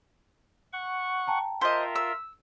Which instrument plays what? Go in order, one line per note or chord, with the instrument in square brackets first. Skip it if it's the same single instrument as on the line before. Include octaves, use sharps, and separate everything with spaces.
[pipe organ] F#5 C#6
[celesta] G5 A5 A#5
[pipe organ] F4 A#4 E5 [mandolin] C5 D#5
[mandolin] E6